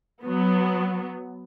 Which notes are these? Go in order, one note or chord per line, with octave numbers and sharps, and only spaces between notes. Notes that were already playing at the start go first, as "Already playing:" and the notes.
F#3 B3